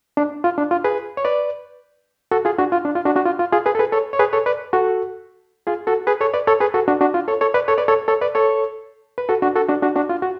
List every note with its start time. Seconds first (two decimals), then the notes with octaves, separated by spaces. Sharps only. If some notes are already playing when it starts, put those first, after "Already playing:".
0.17 D4
0.44 F4
0.58 D4
0.71 F4
0.84 G#4 B4
1.17 C#5
1.25 B4 D5
2.31 F#4 A4
2.45 F4 G#4
2.58 D4 F#4
2.72 F4
2.85 D4
2.95 F4
3.05 D4 F#4
3.15 D4 F#4
3.25 F4
3.39 F4
3.52 F4 G#4
3.66 G#4 B4
3.75 A4
3.79 G#4 B4
3.92 A4 C#5
4.13 C#5
4.19 G#4 B4
4.33 A4 C#5
4.46 B4 D5
4.73 F#4 A4
5.67 F4 G#4
5.87 F#4 A4
6.07 G#4 B4
6.21 A4 C#5
6.34 B4 D5
6.47 A4 C#5
6.60 G#4 B4
6.74 F#4 A4
6.88 D4 F#4
7.01 D4 F#4
7.14 F4
7.28 A4 C#5
7.41 A4 C#5
7.54 B4 D5
7.68 A4 C#5
7.78 B4 D5
7.88 A4 C#5
8.08 A4 C#5
8.21 B4 D5
8.35 A4 C#5
9.18 B4
9.29 F#4 A4
9.42 D4 F#4
9.56 F#4 A4
9.68 D4 F#4
9.82 D4 F#4
9.95 D4 F#4
10.09 F4
10.22 F#4